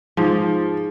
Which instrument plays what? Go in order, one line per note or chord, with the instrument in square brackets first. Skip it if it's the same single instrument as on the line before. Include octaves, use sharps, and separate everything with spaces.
[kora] G#2 [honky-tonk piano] F3